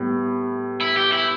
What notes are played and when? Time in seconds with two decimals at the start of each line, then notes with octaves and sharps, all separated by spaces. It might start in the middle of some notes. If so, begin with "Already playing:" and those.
Already playing: A2 G3 B3
0.81 E4
0.97 G4
1.12 E4